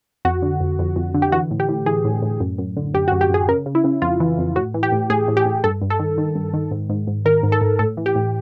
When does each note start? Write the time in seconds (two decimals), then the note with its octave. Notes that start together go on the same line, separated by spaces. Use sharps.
0.25 F2 F#4
0.42 D3
0.60 F2
0.79 F2
0.96 F2
1.14 D3
1.22 G4
1.32 E3 F#4
1.51 A2
1.60 G4
1.69 A2
1.86 E3 G#4
2.05 A2
2.22 A2
2.40 F#2
2.58 F#2
2.77 D3
2.94 F#2 G4
3.08 F#4
3.12 F#2
3.21 G4
3.30 F#2 G#4
3.48 C#3 A#4
3.66 C#3
3.75 E4
3.84 C#3
4.02 F2 F4
4.20 E3
4.38 F2
4.56 A2 F#4
4.74 E3
4.83 G4
4.92 A2
5.10 A2 G#4
5.28 A2
5.37 G4
5.46 A2
5.64 G2 A4
5.82 G2
5.90 A4
5.99 D#3
6.18 D#3
6.35 G2
6.54 D#3
6.71 G#2
6.90 G#2
7.07 G#2
7.25 D#3 A#4
7.43 G#2
7.52 A4
7.61 G#2
7.79 A2 A4
7.97 E3
8.06 G4
8.15 A2